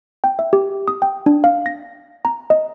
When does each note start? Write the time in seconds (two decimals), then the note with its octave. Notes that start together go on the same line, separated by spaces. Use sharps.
0.24 G5
0.39 E5
0.53 G4
0.88 D#6
1.02 G5
1.26 D4
1.44 F5
1.66 A#6
2.25 A#5
2.50 D#5